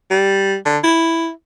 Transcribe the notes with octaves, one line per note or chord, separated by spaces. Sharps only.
G3
D3
E4